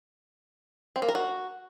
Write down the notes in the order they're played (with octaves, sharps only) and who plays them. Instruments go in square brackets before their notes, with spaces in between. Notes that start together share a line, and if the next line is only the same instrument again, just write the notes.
[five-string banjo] C4
A#3
A#4
F#4